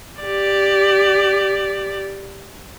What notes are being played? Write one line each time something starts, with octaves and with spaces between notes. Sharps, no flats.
G4 D5